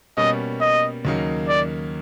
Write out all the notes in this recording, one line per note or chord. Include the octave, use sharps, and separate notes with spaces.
B2 G3 A#3 C#4 D#5
D#5
D#2 C#3 F#3 A#3 D#4
D5